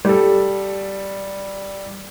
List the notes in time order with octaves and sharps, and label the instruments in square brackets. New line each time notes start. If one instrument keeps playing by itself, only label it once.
[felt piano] G3 A4